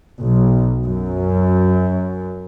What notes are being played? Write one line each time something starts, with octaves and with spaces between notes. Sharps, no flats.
B1
F#2